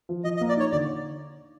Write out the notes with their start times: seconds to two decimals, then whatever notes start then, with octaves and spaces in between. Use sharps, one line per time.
0.09 F3
0.24 F3 D#5
0.37 D#5
0.41 A#3
0.49 D5
0.57 D#4 C#5
0.72 D3 D5